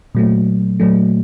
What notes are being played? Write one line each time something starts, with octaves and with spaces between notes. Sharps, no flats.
A#2 F#3 A3
A#2 F#3 A3